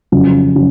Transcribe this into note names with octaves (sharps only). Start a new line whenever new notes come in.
F2 C#3 F#3 C#4
C#3 F#3 C#4